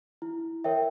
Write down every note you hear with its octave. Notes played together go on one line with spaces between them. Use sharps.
E4
A#4 C#5 E5 G5